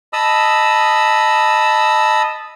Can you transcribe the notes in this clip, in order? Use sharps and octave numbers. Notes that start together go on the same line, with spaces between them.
D#5 A5 B5 D#6 E6